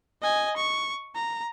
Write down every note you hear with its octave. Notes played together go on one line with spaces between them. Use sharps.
D#5 G#5
C#6
A#5